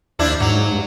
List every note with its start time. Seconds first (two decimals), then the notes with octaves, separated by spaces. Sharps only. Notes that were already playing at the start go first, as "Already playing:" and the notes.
0.19 D#2 F3 D4 E4
0.40 G#2 F#3
0.72 G2